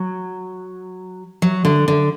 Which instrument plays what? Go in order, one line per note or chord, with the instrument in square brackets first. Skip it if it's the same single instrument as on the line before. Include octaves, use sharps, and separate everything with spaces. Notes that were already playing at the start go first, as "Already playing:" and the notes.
Already playing: [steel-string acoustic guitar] F#3
F#3
D3
D3